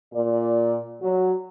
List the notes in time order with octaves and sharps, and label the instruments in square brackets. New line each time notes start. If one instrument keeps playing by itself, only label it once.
[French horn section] A#2 D5
F#3